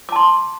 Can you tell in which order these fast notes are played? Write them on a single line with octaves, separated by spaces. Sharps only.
D6 A5 C6